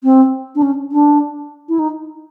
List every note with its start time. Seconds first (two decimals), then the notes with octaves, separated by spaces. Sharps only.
0.04 C4
0.55 D4
0.62 C#4
0.92 D4
1.69 E4
1.79 D#4